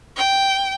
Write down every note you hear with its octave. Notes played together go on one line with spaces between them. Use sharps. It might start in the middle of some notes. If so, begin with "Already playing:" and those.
G5